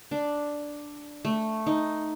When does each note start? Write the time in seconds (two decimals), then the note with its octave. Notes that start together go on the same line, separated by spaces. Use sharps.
0.11 D4
1.25 A3
1.67 D#4